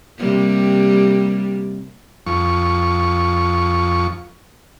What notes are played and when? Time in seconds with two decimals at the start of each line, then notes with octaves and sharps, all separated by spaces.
0.18 C3 G3 A#3
2.26 F2 C#6